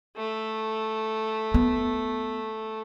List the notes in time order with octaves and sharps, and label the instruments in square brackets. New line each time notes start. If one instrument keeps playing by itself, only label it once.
[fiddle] A3
[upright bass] B3